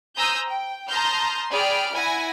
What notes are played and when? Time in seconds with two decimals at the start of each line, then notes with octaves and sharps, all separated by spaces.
0.16 C5 G#5 A#5 D#6 E6 G6
0.46 G5
0.88 A5 A#5 C6 D#6 F6 G6
1.52 G#4 D5 G5 B5 F6 D7
1.92 E4 F#5 G#5 A#6